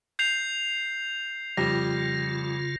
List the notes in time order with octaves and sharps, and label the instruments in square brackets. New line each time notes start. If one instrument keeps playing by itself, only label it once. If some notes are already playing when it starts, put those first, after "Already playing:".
[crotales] G6 C7 F7
[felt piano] F2 G3 [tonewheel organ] C#3 F4 [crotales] A#6